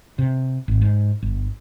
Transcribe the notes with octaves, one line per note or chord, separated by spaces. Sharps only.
C3
G#1
G#2
G1